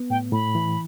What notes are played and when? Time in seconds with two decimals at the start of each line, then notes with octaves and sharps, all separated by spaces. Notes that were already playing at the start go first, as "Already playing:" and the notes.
Already playing: B3
0.10 A2 G5
0.32 A2 B5
0.55 E3